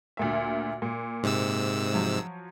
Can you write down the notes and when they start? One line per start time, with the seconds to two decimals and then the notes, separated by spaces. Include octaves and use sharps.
0.17 D2 A#2 E5
0.82 A#2
1.23 G#2 C3 E6
1.94 F3 F#3